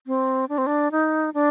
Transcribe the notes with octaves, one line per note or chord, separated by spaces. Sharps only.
C4
D4
C4
D4
D#4
D4